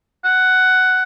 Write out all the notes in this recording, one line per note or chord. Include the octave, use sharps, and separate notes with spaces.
F#5